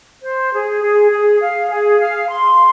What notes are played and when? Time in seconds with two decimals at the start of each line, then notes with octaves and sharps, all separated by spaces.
0.23 C5
0.53 G#4
0.83 G#4
1.11 G#4
1.41 F5
1.70 G#4
1.99 F5
2.29 C6